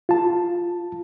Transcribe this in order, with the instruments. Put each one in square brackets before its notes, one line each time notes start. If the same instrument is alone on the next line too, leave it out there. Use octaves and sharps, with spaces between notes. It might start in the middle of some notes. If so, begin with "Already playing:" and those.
[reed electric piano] F4 A5